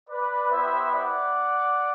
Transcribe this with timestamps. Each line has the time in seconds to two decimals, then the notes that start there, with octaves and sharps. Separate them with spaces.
0.10 B4 D5
0.51 B3 E4 G4 C5 E5
0.92 D5 F#5